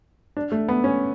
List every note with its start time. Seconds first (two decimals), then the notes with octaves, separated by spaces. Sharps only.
0.37 D4
0.52 A3
0.69 B3
0.84 C#4